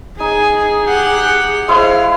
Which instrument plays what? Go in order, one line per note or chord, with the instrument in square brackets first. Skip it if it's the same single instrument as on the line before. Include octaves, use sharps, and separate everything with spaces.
[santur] D#4 [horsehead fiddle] G#4 [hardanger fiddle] G#5
[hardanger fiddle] G4 F#5
[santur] G#3 E4 C5 [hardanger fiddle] F5